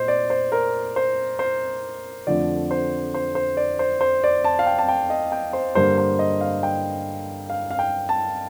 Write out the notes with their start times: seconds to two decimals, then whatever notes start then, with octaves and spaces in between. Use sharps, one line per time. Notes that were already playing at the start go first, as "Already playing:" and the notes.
Already playing: A#2 C5 D#5
0.08 D5
0.30 C5
0.52 A#4
0.96 C5
1.39 C5
2.27 F2 D3 F3 A3 D5
2.71 C5
3.14 C5
3.35 C5
3.57 D5
3.79 C5
4.01 C5
4.24 D5
4.44 A5
4.59 F5
4.67 G5
4.78 A5
4.88 G5
5.10 D#5
5.32 G5
5.53 C5
5.75 G2 D3 G3 A#3 C5
5.98 C5
6.19 D#5
6.41 F5
6.63 G5
7.50 F5
7.71 F5
7.79 G5
8.09 A5